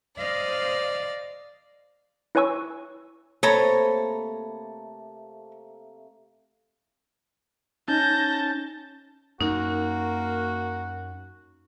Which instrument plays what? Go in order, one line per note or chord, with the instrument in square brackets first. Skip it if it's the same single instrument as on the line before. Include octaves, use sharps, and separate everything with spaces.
[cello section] C5 D#5 F5 [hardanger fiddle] D5
[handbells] E4 B4 C#5 G#5 C#6 E6
[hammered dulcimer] C3 A3 A#3 [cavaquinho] A4 A#5 B5 [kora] C#5
[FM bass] C#4 [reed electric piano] D#4 [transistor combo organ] A5 [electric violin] G6 A#6
[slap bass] F#2 [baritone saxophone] A#3 [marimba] D#4 [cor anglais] F#4